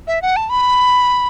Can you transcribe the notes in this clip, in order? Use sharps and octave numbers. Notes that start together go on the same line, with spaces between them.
E5
F#5
A5
B5